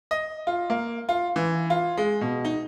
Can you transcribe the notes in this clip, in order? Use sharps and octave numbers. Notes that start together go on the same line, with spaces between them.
D#5
F4
A#3
F4
E3
F4
G#3
B2
D#4